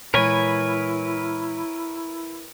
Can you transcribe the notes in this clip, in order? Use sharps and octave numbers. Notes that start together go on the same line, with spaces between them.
A#2 E3 G#3 E4 A#4 B4 C#5 G#5